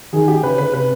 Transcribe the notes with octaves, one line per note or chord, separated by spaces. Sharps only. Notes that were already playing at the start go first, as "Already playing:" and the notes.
D#3 G#4
G4
C#3 B4
D3 B4
C#3
C3 B4